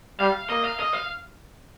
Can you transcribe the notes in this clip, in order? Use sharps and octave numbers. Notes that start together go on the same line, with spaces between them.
G3 F5
A#3 D#5
F5
D#5
F5